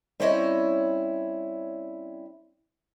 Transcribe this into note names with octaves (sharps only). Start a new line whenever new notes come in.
G3 C4 C#4 E4 C#5 D#5